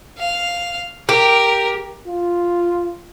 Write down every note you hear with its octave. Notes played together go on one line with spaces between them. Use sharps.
F5
G4 A#4
F4